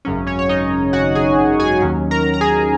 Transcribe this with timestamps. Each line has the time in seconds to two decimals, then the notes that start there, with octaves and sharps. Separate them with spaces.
0.05 G#1 F#2 C#3 F#3 C#4
0.27 C#4 C#5
0.39 C#5
0.49 D#4 D#5
0.93 F#4 F#5
1.15 G#4 G#5
1.60 G#4 G#5
1.82 D#2 D#3 F#3 C#4
2.11 A#4 A#5
2.34 A#5
2.41 G#4 G#5